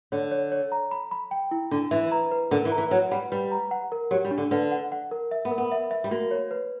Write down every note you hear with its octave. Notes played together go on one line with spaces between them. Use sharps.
D3 C#5
C#5
C#5
A#5
B5
B5
G5
E4
D3 D4
E3 E5
A#5
B4
D3 A#4
E3
A#5
E3
F#3 B4
G3 F#5
G3 B4
A#5
F#5
A#4
F#3 G4
G3
D4
D3
D3 B4
F#5
F#5
A#4
E5
B3
A#4
B3
E5
E5
G3
A#3 F#4
C#5
B4